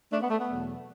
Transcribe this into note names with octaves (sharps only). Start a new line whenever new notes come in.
A3 D4
B3
A3
B3
E2 B2 F#3 A3